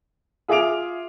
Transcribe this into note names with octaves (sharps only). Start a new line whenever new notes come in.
F4 G#4 E5 D6 D7 F7